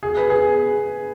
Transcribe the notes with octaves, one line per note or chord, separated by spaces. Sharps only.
G#4
B4
G#4